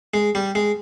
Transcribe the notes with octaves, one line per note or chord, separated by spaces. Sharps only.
G#3
G3
G#3